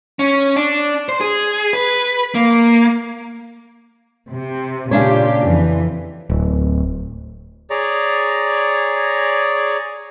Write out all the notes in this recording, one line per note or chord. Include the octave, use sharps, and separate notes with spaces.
C#4
D4
C5
G#4
B4
A#3
C3
A#2 C#3 D4 G4 C#5
F2 E3
D1
G#4 C#5 D5 A#5